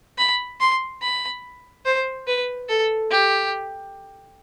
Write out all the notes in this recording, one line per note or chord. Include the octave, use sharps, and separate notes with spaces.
B5
C6
B5
C5
B4
A4
G4